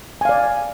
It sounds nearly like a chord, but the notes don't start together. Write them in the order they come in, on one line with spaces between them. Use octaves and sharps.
G#5 F5 D5